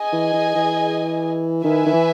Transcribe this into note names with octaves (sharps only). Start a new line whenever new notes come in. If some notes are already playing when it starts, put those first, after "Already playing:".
Already playing: G#4 D#5 G#5
E3
E3
E3
D#3 E4 B4 E5 G#5
D#3
E3